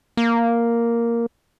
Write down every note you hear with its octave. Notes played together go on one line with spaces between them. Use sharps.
A#3